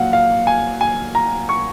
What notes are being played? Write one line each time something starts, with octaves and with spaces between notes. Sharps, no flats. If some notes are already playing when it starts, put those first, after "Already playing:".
Already playing: A#2 F#3 A#3 F5 F#5
F5
G#5
G#5
A#5
C#6